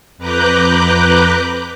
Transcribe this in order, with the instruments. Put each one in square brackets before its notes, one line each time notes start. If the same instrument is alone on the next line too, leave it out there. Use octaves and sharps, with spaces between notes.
[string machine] F2 B4 A#5 D6 F#6 G6